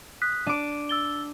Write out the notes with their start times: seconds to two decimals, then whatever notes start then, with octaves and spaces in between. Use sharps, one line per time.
0.22 D#6 F#6 B6
0.47 D4 D6 D#7
0.89 E6 A6 G7